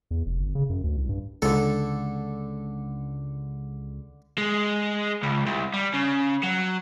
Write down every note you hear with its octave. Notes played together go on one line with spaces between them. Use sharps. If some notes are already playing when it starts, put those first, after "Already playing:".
E2
F1
G1
C#3
F#2
D2
C2
G2
C#2 D3 A4
G#3
C#2
C2
G3
C#3
F#3